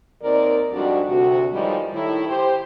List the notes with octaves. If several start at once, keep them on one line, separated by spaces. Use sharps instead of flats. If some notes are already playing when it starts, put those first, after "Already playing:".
D#2 C4 D#4 A#4 D5
F2 G#2 G3 D4 F#4 D5
D2 C3 F#4
A2 D#3 F3 G3 G#3
A2 D#3 E4
G4 C5